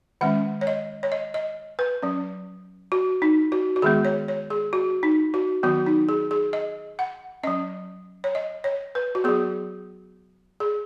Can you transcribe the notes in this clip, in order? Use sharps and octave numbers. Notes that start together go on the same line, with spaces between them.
D#3 G#3 C#4 F#5
C#5
D#5
C#5
D#5
D#5
B4
F#3 C#4
F#4
D#4
F#4
F#4
D#3 G#3 B3 G#4
C#5
C#5
G#4
F#4
D#4
F#4
D#3 F#3 B3 F#4
D#4
G#4
G#4
D#5
F#5
F#3 C#4 D#5
C#5
D#5
C#5
B4
F#4
F#3 B3 G#4
G#4